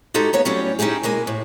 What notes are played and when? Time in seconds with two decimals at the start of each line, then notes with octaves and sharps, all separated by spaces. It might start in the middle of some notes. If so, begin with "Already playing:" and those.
0.14 G#3 D#4 F#4 G4 A4
0.33 A#3 B3 C#5 A#5
0.45 A2 F#3 G3 C#4 G4 C#5
0.79 C#4 D#4 E4 G4 G#4
1.03 B2 G#3 A#3 G#5
1.27 A2